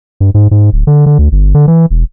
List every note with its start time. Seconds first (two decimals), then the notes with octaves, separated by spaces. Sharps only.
0.20 G2
0.34 G#2
0.51 G#2
0.73 D1
0.87 D3
1.06 D3
1.19 D2
1.32 G1
1.54 D3
1.68 E3
1.91 E1